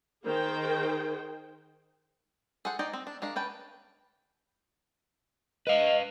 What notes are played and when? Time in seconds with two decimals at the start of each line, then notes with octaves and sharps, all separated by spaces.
0.24 D#3 G#4 C5 G5
2.65 G#4 A4 C5 F#5
2.79 D#4 C5 D5 D#5 G5
2.93 C4
3.07 D4
3.22 G#3 D4 A#4 F5
3.36 C#4 B4 G5 A5
5.67 B4 D#5 F5